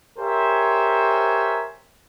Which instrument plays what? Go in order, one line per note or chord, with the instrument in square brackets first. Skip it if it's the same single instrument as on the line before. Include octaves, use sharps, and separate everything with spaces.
[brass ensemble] G4 A#4 C5 C#5 E5 G#5